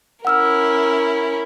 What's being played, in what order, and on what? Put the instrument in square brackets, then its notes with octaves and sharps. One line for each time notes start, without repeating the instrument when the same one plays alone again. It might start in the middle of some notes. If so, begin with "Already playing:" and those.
[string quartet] C#4 E4 A#4 [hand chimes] F#5 E6 F6